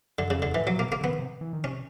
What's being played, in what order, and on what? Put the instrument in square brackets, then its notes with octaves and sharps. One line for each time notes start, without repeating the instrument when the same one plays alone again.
[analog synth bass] F#2 [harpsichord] D3
[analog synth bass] F2 [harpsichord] C#3
[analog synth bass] E2 [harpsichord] D3
[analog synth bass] A2 [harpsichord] E3
[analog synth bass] A#2 [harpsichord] F#3
[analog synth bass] B2 [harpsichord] A#3
[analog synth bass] C#3 [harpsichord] A#3
[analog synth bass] D3 [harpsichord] B3
[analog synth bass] D#3
C3
E3
D#3
[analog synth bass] C3 [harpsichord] C#4